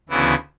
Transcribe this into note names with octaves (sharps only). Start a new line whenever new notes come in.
D2 C#3 E3 B3 E4